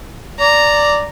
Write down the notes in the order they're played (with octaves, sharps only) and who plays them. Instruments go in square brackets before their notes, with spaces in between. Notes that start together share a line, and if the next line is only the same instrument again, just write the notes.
[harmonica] D5 [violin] A#5